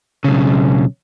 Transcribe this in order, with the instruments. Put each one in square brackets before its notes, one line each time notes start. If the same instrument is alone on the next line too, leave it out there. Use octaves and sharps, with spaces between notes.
[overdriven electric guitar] B1 C#3